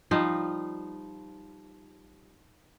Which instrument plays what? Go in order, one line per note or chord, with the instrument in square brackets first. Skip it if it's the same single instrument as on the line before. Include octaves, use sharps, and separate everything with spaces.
[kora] F3 G3 D#4 F5